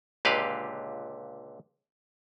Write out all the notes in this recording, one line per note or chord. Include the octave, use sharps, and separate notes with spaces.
C#2 A#2 D3 G4 B4 F5